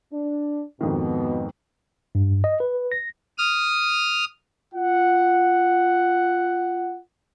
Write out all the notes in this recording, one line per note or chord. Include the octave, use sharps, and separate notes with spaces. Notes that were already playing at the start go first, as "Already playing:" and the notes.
D4
F2 G#2 B2 D#3
G2
D#5
B4
A#6
D#6 F6
F4 F#5